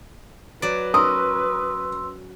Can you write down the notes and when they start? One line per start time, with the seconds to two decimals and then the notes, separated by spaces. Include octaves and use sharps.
0.62 F#3 B4 D5
0.94 C#4 A#4 C6 D#6 E6